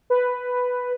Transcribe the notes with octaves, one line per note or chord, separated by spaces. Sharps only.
B4